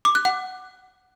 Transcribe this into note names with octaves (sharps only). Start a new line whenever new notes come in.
D6
F#6
F#5